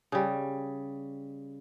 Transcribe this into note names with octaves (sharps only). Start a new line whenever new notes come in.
C#3 G3